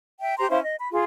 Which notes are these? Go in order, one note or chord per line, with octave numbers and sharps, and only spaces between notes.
E5 G5
G4 C5 A#5 C6
C#4 E4 C5 F5
D#5
B5
F4 G#4